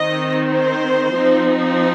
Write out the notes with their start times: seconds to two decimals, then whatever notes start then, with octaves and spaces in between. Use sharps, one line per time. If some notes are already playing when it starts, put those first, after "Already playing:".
Already playing: D#3 C4 D#4 D#5
0.52 C5
1.15 F3 C4 D#4